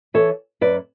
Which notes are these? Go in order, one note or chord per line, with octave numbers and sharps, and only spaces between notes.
E3 A4 C#5
F#2 B4 D5